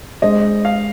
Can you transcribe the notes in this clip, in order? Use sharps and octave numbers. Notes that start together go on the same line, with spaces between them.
G#3 D4 G#4 C5 D#5
F5